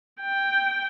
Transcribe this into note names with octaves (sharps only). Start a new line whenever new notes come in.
G5